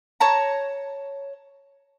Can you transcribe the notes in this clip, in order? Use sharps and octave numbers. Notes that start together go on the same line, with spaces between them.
C#5 A5 A#5